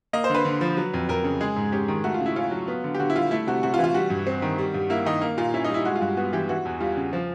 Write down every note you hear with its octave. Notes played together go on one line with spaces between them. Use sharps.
A#3 D#5
C5
D3
B4
D3
F3
F#3
F2
F2 A#4
C#3
G#3 G#4
G#2
C#4 G4
D#3
A3 F#4
F4
C#3
E4
C#4 F4
F#3
B3
D3
G4
D3 F#4
E4
G3 F4
A3 E4
C3 F#4
C3 F#4
F4
E3
F4
G3 F#4
G2
C4
D#3
G3
G2
A#3 E4
D#3 D#4
A#3
A#2 F4
C#4 E4
D#4
G3 E4
G#3 F#4
F4
G2 F#4
B3 F#4
E3 G4
E3 F#4
E2
G3 F4
C#3
F3